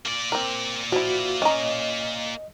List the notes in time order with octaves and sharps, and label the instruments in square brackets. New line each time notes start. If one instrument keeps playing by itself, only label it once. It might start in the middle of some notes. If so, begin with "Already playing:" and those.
[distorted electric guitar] A#3 D5
[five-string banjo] C4 A#4
[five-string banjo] F3 E4 [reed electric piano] F#4
[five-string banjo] C#4 A#5 [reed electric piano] D#5